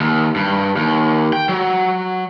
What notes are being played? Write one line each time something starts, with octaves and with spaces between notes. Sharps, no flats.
D#2
G2
D#2
G5
F#3